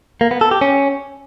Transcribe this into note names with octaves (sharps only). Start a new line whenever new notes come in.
A#3
B3
A4
G4
C#4